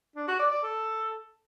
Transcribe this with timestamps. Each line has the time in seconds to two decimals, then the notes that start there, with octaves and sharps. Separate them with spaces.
0.16 D4
0.28 F#4
0.39 D5
0.51 D5
0.63 A4